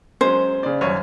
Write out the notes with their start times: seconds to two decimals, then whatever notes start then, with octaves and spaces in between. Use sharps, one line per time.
0.21 F#3 G#3 C#4 C5
0.63 C#3 D5
0.81 D#1 F#2 C#5